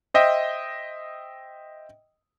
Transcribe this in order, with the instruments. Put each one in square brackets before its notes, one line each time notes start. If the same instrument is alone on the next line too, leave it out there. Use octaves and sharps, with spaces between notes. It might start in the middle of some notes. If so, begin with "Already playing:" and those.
[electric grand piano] C5 D#5 E5 G5